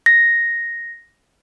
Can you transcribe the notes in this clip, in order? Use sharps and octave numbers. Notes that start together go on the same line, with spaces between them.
A#6